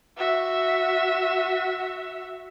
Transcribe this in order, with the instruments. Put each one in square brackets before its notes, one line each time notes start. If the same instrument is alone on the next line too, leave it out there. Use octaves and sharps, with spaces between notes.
[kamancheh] F#4 E5